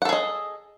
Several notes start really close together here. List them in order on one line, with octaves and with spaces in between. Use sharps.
F#5 A4 G#4 D#5